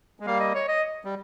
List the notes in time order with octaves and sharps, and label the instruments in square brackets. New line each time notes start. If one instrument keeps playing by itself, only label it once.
[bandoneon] G#3
[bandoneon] G3 A#3 [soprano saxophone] F5
[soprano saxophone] D#5
C#5
D#5
[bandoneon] G3